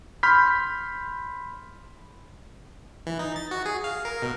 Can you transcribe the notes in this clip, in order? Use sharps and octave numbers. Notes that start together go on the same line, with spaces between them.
B5 C6 F6 G6 B6
E3
D#4
A6
F#4
G#4
F5
A#4
B2